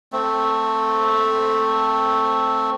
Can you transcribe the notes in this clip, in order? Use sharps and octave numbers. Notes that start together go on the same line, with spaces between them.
A3 C4